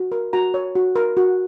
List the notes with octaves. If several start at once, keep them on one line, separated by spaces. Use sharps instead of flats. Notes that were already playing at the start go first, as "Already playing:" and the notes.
Already playing: F#4
A#4
F#4 A#5
C#5
F#4
A#4
F#4